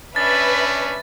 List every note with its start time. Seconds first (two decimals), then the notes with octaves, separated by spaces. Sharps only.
0.16 C#4 D4 B4 E5 B5 A6